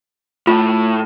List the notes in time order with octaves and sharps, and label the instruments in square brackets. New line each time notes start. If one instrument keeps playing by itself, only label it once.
[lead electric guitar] A2 [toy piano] F4